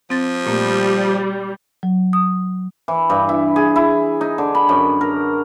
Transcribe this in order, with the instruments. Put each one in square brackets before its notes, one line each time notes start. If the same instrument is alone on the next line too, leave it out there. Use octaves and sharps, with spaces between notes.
[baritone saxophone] F3 [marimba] C4 A6
[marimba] A#2 A3 A#3 [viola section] G3
[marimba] F#3
D#6
[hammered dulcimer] E3
G2
E4
G#4
E4
D#4
D3
B5
F#2
A#4